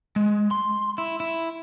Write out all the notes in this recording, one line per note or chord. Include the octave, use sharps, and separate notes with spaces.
G#3
C6
E4
E4